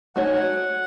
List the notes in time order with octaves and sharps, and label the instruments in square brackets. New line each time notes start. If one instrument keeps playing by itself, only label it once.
[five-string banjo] A3 D#4 F#4 C#5 [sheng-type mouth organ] F#5
[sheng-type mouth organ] G#5
F#5